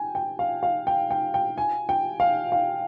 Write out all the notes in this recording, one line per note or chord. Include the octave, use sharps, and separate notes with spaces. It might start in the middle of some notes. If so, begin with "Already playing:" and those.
Already playing: G5 G#5
G5
F5
F5
G5
G5
G5
G#5
G5
F5
F5